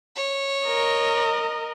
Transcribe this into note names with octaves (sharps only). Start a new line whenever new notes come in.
C#5
A#4 D#5